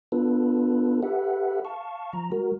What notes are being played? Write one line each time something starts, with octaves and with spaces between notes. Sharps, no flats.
B3 D4 F4 A4 B4
G4 A4 B4 E5 F#5
F5 A5 C#6
F3 A#5
G#3 F#4 A#4